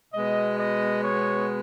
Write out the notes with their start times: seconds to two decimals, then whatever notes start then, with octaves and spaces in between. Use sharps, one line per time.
0.14 B2 G#3 B3 D#5
0.57 D#5
1.01 C#5